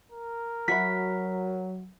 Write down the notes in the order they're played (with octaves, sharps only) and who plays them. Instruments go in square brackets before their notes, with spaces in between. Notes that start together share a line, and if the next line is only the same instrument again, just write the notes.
[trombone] A#4
[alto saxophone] F#3 [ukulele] F#4 E5 B5 [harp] B6